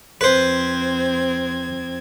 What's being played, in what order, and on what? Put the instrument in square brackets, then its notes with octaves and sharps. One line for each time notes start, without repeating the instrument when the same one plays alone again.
[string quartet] F2 C4 G#6 [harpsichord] B4 C5